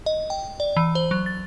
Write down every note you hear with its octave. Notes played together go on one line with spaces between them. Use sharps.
D#5
G5
D5
E3
C5
F#3
A6